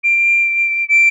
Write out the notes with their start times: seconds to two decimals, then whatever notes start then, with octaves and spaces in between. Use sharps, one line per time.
0.04 D7
0.89 D7